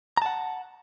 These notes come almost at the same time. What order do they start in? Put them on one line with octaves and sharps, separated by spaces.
A#5 A5 F#5